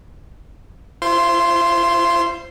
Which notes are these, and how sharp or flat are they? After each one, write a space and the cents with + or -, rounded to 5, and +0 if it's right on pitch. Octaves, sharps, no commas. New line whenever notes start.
F4 -45 C5 +0 C6 +0